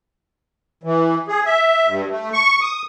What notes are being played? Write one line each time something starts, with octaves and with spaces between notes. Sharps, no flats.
E3
G#4
E5
G2
A3
C#6
D#6